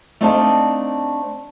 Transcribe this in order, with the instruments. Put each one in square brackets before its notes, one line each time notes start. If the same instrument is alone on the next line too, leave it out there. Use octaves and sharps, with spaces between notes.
[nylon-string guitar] A3 C4 D4 D#4 F5 A5